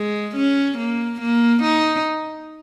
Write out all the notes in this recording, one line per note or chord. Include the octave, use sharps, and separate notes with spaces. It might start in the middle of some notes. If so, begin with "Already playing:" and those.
Already playing: G#3
C#4
A#3
A#3
D#4